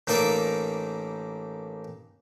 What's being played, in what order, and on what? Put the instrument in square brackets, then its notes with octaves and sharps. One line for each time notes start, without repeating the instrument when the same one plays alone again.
[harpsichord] A1 A#3 D#4 A#4 D5 E5